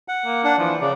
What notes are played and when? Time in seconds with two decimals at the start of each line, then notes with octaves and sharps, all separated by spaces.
0.08 F#5
0.25 A#3
0.44 D4 F#5
0.58 E3 F3
0.81 C#3 D5